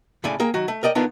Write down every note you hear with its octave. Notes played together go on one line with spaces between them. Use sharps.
D2 A2 C#3 A3 D5 G#5
A#3 G#4 A#4 G5
D#3 F#3 F#4
A3
A#4 D5 D#5 G5
D3 D#3 B3 D4 F4